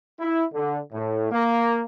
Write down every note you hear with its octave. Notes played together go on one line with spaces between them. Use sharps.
E4
D3
A2
A#3